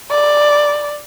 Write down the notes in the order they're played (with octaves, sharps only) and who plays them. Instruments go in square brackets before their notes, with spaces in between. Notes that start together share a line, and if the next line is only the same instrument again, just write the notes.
[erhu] D5